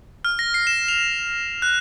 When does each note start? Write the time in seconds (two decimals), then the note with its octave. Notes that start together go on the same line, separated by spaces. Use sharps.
0.25 F6
0.39 A#6
0.54 C7
0.67 E7
0.88 F7
1.62 F#6